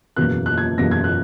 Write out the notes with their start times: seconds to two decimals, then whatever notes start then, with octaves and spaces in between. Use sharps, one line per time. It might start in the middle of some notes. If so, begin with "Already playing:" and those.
0.16 F#1 E2 B2 A#3 F#6
0.46 F#6
0.58 G#6
0.78 F#1 E2 B2 A#3 A#6
0.91 G#6
1.04 F#6